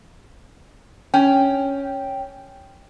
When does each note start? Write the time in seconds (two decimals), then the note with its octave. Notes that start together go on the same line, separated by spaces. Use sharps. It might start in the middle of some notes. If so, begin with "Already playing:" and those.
1.14 C#4 G5